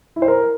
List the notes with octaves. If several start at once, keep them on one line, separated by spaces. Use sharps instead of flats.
E4
C5
A#4